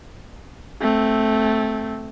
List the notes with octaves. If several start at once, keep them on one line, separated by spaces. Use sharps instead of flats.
A3 C4